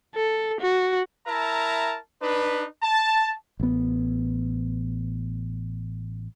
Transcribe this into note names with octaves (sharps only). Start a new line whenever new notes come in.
A4
F#4
E4 A#4 E5 A5 A#5
D4 D#4 B4
A5
A1 B3